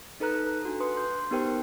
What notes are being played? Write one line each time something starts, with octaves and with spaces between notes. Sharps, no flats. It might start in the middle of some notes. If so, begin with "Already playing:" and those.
D#4 A4 B4 A#5 F#6
A4
D4 F#4 A4
B4 C6 D#6 F#6
C6 G6
B3 D#4 G4 A#4 C5 G5